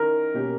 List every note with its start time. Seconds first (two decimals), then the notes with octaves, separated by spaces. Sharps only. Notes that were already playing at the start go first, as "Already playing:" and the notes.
Already playing: D#3 C#4 E4 A#4
0.34 B2 A#3 C#4 G4